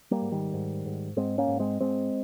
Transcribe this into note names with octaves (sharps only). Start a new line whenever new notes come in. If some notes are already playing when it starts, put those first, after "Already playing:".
G3 A#3
G#2
D#3 G3
G#2
G#2
G#2 G#3 C4
A#3 C#4
G#2
G#3 C4
G#2 G#3 C4